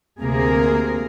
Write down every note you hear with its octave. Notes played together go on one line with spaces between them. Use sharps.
D2 C3 A#3 G#4 A#4